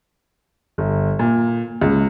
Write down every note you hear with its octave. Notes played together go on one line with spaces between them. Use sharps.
G1
A#2
C#2